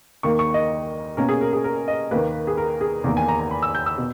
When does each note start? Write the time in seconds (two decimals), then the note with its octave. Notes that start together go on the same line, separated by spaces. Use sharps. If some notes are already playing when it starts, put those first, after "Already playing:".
0.23 D#2 D#3 A#3 C#6
0.39 C#6
0.54 D#5
1.17 B2 A#3 C#4 A#4
1.29 G#4
1.41 A#4
1.53 G#4
1.64 A#4
1.88 D#5
2.11 D#2 D#3 A#3 B4
2.47 G#4
2.57 A#4
2.81 G#4
3.04 E2 D#3 A#3 A#4
3.17 G#5
3.28 A#5
3.40 A#5
3.51 B5
3.62 E6
3.75 G6
3.86 E6
3.98 B2